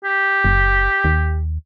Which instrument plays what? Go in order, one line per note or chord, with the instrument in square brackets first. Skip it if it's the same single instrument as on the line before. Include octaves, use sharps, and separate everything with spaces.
[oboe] G4
[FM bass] F#1
D#2